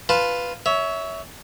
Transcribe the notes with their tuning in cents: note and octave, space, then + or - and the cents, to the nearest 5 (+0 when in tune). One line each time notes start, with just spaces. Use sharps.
F4 +0 B4 +0 A5 +0
C#5 +20 E5 -15